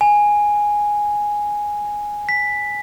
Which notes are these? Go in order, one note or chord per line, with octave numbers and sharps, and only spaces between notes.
G#5
B6